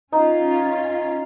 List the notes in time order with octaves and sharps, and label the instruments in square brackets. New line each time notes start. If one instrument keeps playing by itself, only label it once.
[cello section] C#4 F4 [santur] D#4